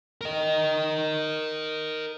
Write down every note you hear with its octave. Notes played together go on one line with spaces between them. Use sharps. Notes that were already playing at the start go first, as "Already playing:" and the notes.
A#4 D#5